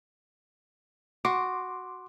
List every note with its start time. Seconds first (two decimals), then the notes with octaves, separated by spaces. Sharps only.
1.25 F#4 C6 D6